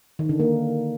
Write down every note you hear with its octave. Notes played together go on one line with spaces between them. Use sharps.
D#3
D3
A#3